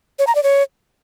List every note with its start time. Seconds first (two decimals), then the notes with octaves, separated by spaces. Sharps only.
0.19 C#5
0.27 A#5
0.35 D5
0.43 C#5